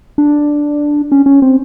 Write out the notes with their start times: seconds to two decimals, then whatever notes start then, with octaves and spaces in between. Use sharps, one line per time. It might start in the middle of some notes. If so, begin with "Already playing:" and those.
0.18 D4
1.12 C#4
1.26 C#4
1.42 C4